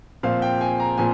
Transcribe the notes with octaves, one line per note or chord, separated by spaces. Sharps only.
A#2 F3 C4 F5
G5
G#5
A#5
A#2 F3 C4 G#5